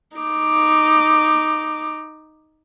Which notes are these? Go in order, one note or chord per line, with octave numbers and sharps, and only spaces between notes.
D#4 D6